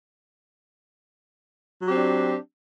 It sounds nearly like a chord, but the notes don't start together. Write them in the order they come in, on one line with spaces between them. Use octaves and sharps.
F#3 G4 C4 D4